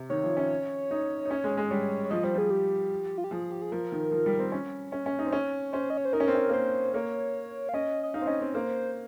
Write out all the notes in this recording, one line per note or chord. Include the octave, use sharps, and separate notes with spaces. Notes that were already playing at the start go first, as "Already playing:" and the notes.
Already playing: C3
D#3 C#5
F3
C#4
D#4
D#4
C#4
G#3
G#3
G3 C#5
C#5
F3 D#5
G3 C5
F3 G#4
G4
F4
G4
F3 G#4
G4
G#4
F3 A#4
D#3
F3
G3
C4
C#4
C#4
C#4
D#4
C4
C#4
C#4 C5
D#5
C#5
C5
D#4 A#4
C#4
C4
C#4
A#3
C4 C5
A#3 C#5
F5
C#4 D#5
D#5
D#4 F5
C4
C#4 D#5
C4
A#3 C5